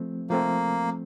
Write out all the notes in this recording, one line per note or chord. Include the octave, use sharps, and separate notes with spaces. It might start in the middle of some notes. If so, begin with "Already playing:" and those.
Already playing: F3 A3 C4
F3 A3 A#3 C4